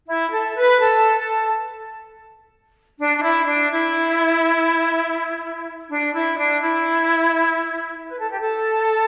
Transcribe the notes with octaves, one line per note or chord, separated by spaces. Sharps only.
E4
A4
B4
A4
A4
D4
D4
E4
D4
E4
D4
E4
D4
E4
B4
A4
G4
A4